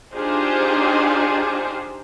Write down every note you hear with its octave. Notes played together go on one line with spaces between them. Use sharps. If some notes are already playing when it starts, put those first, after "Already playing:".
D4 D#4 F4 G4 G#4 C5